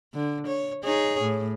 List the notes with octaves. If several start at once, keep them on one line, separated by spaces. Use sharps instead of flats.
D3
C#5
D#4 G#4 C#5
A2